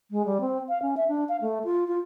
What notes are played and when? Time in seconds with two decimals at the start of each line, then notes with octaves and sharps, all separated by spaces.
0.11 G#3
0.26 G3
0.41 C4
0.69 F5
0.82 C#4
0.97 E5
1.08 D4
1.29 F5
1.41 A3
1.64 F4
1.88 F4